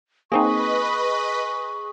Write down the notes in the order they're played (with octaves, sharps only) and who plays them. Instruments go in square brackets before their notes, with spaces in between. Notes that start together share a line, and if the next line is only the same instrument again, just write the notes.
[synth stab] A#3 C4 D#4 [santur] G#4 [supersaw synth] B4 D#5 B5 [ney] C#6